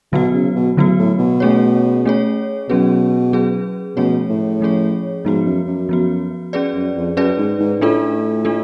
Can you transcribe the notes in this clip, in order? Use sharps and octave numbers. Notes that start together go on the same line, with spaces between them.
B2 D3 F#3 B3 F#4
C#3
B2
A2 D3 F#3 B3 F#4
A2
B2
A3 C#4 G#4 C#5
A3 C#4 G#4 C#5
B2 F#3 C#4 G#4 B4
F#3 C#4 G#4 B4
B2 F3 A3 C#4 G#4 C#5
A2
F3 A3 C#4 G#4 C#5
G#2 F3 B3 F#4
F#2
F#2
F3 B3 F#4
C#4 G#4 B4 D5
F#2
F2
F#2 C#4 G#4 B4 D5
G#2
G#2
A2 A3 D4 F4 A4
A3 D4 F4 A4